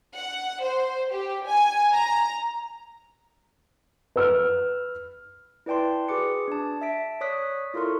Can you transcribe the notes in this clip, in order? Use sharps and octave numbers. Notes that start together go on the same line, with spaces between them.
F#5
C5
G4
G#5
A#5
B4 E6 F6
E4 B4 D5 G5 A5 C6
F#4 G#4 B4 D6 C#7
D4 A5
E5 A5 B6 D7
C#5 D5 C#6 D#6 F#6 B6
E4 F4 A4 A#4 C6 C#6